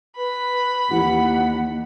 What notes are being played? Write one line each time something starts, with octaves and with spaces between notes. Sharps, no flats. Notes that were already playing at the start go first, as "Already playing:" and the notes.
B4 B5
D#2 E3 G4 F#5